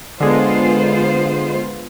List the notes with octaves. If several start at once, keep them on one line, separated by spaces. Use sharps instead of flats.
D3 G#3 B3 F4 C5